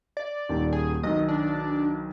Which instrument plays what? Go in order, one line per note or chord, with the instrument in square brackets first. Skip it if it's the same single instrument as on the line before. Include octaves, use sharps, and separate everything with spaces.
[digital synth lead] D5
[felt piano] D#1 D#3
[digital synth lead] G#4
[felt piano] B1 D#3 [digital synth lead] D#5
[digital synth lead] D4